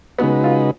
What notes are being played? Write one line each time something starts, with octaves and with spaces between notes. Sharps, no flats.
C#3 G#3 B3 D#4 F#4 B4
F4